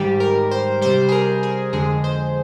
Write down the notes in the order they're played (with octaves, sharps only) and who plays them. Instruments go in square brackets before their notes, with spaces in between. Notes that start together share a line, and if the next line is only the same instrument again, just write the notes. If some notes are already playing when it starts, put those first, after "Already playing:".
Already playing: [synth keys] G#2 D#3 G3 G4
A#4
C5
C3 G3 C5
G#4
A#4
G#4
F2 D3 G#3 G#4
C5